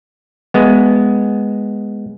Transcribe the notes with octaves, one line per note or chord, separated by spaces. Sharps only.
G#3 B3